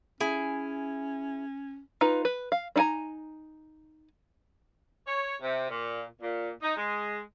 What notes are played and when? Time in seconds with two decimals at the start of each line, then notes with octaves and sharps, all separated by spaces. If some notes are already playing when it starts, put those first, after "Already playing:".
0.20 C#4 E4 G#4
2.01 D#4 F4 B4
2.25 B4
2.52 F5
2.76 D4 D#4 F5 G#5 A#5
5.07 C#5
5.42 C3
5.70 A#2
6.22 A#2
6.62 D#4
6.77 G#3